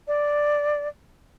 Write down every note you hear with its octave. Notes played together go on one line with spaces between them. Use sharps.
D5